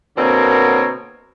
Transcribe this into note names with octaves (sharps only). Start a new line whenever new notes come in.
B2 D3 A#3 C4 A#4 C#5